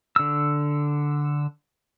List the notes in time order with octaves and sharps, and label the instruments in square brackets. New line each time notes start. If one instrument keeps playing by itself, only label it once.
[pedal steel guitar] D3 E6